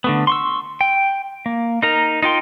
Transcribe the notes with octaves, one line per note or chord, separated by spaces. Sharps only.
D3 A3 B3
C6 C#6 E6
G5
A#3
D#4 A#4 A#5
D#4 F4 G5 C6